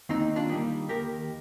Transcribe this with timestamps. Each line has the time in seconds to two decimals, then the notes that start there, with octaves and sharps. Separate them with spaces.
0.09 D#2 C4 D#4
0.36 D4 F4
0.49 D#3 G3 A#3
0.89 D#2 G4 A#4